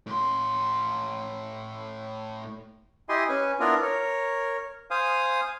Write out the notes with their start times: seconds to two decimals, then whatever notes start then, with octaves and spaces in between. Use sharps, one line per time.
0.06 A2 C6
3.09 E4 G4 D#5 G#5 C6
3.29 C#4 B4 G#5
3.60 B3 D4 E4 F4 A#4
3.82 A#4 C#5
4.91 C5 F5 G#5 D#6